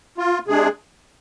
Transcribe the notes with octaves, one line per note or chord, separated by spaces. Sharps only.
F4
C3 G#3 D4 G#4